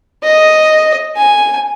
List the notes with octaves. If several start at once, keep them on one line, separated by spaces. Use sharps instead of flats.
D#5
G#5